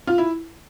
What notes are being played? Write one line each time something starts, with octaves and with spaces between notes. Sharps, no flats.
F4
E4